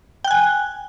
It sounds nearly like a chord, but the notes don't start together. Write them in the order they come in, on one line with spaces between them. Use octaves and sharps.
G5 F#6 G#5